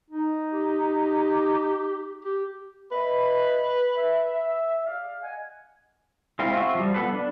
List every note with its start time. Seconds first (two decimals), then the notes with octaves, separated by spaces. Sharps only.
0.10 D#4
0.52 G4
2.25 G4
2.92 B4 D#5 E5 B5
3.96 E5
4.86 G#4 D5 F5
5.22 D#5 F#5 G#5
6.39 G#3 C4 E4 F4
6.53 C4 F4 F#4 E5
6.75 F3 G3
6.94 B3 A4 B4
7.12 D4